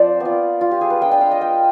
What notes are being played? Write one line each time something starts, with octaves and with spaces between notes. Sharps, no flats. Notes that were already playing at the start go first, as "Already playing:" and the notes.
Already playing: F3 C4 C5 D5
B3
F4
F4
G4
G#4
B4
G#3 D4 F4 G5
G5
F5
D#5
G5